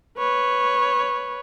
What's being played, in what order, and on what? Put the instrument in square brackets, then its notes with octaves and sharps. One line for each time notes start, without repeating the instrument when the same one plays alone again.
[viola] B4 C#5